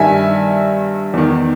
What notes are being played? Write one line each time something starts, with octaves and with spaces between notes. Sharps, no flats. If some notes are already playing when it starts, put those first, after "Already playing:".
Already playing: G2 D#3 E5 G#5
E2 D#3